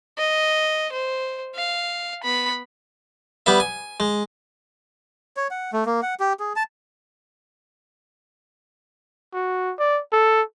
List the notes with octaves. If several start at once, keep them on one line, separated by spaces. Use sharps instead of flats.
D#5
C5
F5
B3 B5
G3 B3 E5
G#5
G#3
C#5
F#5
A3
A#3
F#5
G4
G#4
A5
F#4
D5
A4